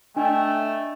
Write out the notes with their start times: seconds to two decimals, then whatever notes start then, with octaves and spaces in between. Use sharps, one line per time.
0.17 A3 D4 D#5 G5 G#5